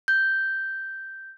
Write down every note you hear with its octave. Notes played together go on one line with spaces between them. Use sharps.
G6